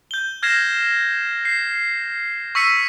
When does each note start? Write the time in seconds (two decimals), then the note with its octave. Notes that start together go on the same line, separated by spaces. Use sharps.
0.11 G6 G7
0.43 F6 G#6 A#6 C7 E7
1.45 C7
2.55 C#6 E6 B6 C#7 D#7